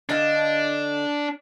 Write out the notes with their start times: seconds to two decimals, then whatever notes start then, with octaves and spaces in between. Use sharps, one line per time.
0.09 D3 D4 D#5 F5